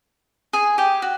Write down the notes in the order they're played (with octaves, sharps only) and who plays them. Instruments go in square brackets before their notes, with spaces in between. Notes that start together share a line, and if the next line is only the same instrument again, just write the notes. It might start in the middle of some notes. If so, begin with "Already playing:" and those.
[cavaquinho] G#4 G#5
G4 G5
F#4